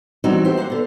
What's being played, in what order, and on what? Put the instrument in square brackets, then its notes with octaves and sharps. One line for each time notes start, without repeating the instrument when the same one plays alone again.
[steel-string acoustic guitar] E3 G3 C4 D#4 F#4
G4 C5 E5
A#3 C5 F#5
D3 B3